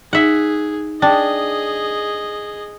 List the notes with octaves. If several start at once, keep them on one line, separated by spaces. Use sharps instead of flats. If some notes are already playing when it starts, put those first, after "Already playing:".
D#4 G#4 E5 F#5
D4 G#4 D#5 G5